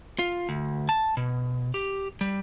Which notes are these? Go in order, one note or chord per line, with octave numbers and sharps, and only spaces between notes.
F4
D2
A5
B2
G4
G3